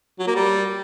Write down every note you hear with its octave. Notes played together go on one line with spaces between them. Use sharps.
F#3
A#3
G3